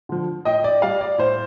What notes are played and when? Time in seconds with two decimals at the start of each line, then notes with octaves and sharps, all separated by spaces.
0.09 D3 F3
0.45 A2 D#5 G5
0.64 D5
0.82 G3 D5 F5
1.01 D5
1.18 A2 C5